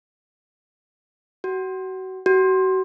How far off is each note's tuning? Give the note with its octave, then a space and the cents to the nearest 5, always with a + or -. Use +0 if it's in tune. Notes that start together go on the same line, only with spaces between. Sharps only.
F#4 +30
F#4 +35